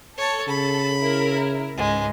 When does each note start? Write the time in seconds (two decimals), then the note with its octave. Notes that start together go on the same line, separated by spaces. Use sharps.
0.18 A4 C#5 A5
0.48 C#3 B5
1.00 E4 A#4
1.77 C#2 G#2 G#3